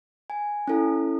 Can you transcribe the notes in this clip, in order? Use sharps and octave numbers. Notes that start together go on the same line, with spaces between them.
G#5
C#4 E4 A4